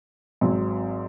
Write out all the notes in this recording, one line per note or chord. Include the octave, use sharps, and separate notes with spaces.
G#1 G#2 F#3 C4